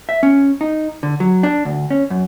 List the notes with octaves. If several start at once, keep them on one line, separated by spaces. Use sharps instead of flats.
E5
C#4
D#4
D3
F#3
D4
D2
C#4
F#2